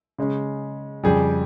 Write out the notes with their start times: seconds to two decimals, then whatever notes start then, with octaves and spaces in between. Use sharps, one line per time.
0.18 C#3 G#3 C#4
1.04 F2 C#3 G3 G#4